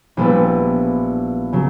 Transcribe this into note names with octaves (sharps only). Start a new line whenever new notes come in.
A#1 A#2 G3 B3 E4
C#3 F#3